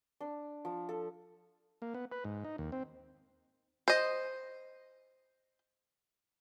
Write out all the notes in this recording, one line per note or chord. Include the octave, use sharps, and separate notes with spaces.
D4
F3
A4
A#3
B3
B4
G#2
D#4
D#2
C4
C5 D#5